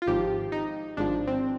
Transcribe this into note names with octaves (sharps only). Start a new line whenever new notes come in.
F4
G#1 G#2 F3 G4
D#4
G#1 G#2 F3 D4
C4